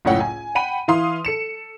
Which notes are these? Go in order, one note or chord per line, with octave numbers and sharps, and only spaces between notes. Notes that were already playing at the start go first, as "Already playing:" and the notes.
F#1 C#2 A2 C#5 F#5 G5
G#5
F#5 G5 B5 D#7
E3 E4 F5 C6 D#6
A4 C#7 E7